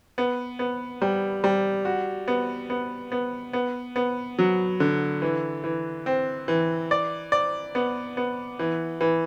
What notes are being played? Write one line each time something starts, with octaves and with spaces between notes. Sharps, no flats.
B3
B3
G3
G3
F#4
B3
B3
B3
B3
B3
F#3
D3
E3
E3
C4
E3
D5
D5
B3
B3
E3
E3